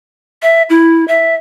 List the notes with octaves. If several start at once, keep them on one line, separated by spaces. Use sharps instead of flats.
E5
E4
E5